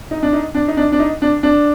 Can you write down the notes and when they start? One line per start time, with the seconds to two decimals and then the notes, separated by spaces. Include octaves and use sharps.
0.11 D#4
0.23 D4
0.33 D#4
0.55 D4
0.68 D#4
0.77 D4
0.92 D4
0.99 D#4
1.22 D4
1.43 D4